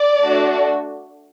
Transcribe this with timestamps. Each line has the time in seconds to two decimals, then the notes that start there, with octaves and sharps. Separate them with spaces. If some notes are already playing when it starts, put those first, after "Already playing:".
Already playing: D5
0.22 A3 D4 F#4